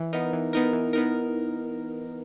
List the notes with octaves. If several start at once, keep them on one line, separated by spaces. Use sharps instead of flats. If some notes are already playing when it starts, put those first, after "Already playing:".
Already playing: E3
B3 D#4 A#4
E3
B3 D#4 A#4
E3
B3 D#4 A#4